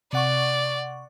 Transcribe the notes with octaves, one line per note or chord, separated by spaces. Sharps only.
C3 D5 F#5 C#6